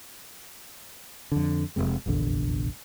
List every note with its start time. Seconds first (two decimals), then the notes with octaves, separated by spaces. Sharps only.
1.32 F2 D3
1.76 F1 C2 C3 G#3
2.06 F1 A#1 E2 D3